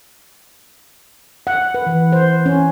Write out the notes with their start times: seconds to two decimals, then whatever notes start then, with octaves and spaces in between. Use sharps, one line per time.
1.47 F#5
1.74 B4
1.86 E3
2.12 C5
2.46 C#4